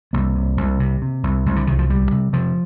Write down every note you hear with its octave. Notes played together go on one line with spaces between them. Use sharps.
C2 A#3
C3
C2
C3
C3
C2
C2
D3
C2 D#3
F3
D2 G3
C3
C3 F3